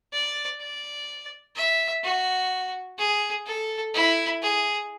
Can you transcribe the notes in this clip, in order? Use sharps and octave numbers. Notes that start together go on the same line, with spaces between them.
D5
D5
E5
F#4
G#4
A4
E4
G#4